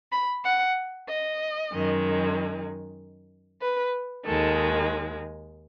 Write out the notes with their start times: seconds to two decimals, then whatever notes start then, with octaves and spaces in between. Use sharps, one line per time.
0.12 B5
0.44 F#5
1.07 D#5
1.71 F#2 D#3 G#3
3.61 B4
4.25 D#2 D#3 G#3 A4